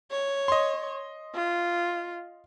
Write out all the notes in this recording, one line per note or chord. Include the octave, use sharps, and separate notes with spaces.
C#5
D#5 C6
F4